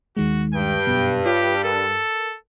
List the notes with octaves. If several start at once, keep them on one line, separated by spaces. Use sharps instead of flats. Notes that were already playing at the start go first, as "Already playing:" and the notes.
D#2 D#3 G#3 F#4
G2 G5
F#2 B2
F4 G4 C#5
A4 A#4